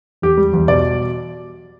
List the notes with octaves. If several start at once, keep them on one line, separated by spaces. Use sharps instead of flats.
E2 G4
G3
E2
B2 D5